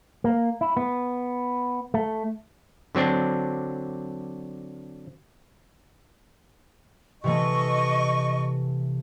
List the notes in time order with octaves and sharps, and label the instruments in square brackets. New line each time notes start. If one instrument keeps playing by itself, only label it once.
[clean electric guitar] A#3
E4
B3
A3
[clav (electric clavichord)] D3 F#3 C4 D4
[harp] C3 E3 A3 [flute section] D#5 C#6